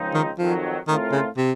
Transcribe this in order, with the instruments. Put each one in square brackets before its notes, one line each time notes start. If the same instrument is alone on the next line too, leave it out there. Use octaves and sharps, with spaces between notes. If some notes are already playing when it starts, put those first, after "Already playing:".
Already playing: [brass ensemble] C#2 C#3 F3 C4 D#4
[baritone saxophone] D#3
[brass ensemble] F2 D#3 F#3 [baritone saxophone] F3
[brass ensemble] A2 A3 C4 F4 A#4 [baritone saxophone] D#3
[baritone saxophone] C#3
C3